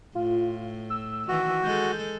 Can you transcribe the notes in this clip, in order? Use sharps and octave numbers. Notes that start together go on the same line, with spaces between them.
A2 F4
E6
D#3 E3 F#4
G#3 A4 G6